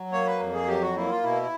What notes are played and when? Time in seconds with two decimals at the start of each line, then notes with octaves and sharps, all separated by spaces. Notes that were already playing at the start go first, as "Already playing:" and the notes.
Already playing: F#3
0.12 A#3 C#5
0.26 B4
0.40 F2
0.54 G#4
0.68 F#3 G4
0.81 F#4
0.96 A#3 E4
1.10 F4
1.23 B2 E4